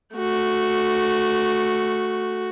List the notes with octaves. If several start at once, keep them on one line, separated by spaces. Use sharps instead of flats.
A3 F#4